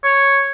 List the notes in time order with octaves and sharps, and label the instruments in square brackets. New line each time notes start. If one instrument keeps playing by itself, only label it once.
[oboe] C#5